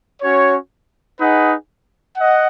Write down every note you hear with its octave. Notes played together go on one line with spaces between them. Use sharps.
C#4 F#4 C#5
D#4 G#4 B4 D#5 F#5
D#5 F#5